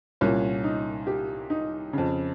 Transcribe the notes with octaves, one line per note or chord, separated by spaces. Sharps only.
C2 A#2 C#4
D#4
G4
D#4
F2 C#3